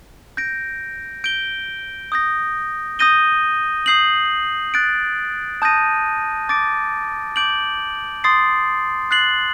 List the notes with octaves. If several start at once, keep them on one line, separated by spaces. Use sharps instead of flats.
G6 A#6 D7
G6 D7 G7
D#6 G6 A#6
D#6 G6 A#6 D#7 G7
D#6 G6 C7 F#7
F#6 A6 D7
A5 D#6 G6 A#6 D#7
D6 A6 D7
D6 G6 D7 F#7
C6 D#6 A6 C7
F#6 A6 C7 F#7